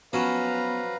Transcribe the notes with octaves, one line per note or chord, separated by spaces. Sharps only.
F3 F#3 B3 C#4 B4 F5 A#5 B5